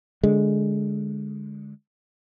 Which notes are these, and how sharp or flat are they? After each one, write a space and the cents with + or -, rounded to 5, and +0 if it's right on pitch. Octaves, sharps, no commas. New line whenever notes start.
D3 -5 G#3 +0